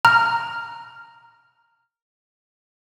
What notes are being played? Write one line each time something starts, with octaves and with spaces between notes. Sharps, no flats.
A#5 F6